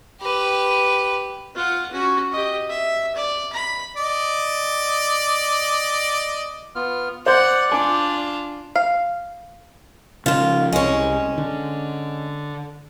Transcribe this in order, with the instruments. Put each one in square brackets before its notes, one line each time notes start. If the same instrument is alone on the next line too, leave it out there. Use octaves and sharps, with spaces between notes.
[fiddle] G4 B4
[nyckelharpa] F4 F#5
C#4 F#4
G4 D#5
E5
D5
B5
[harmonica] D5 D#5
[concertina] B3 F4 F6
[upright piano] C5 G6 [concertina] D5 [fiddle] F#5
[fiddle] D4 F4 [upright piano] G#5 D6
[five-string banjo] F5
[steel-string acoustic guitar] D#2 F4 [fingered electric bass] C#3 E3 F3
[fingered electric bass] C2 [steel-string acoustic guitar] G#3 C#4
[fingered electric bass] D3